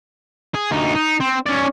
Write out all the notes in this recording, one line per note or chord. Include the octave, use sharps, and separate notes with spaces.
G#4
D2 D#4
D#4
C4
C#4 D5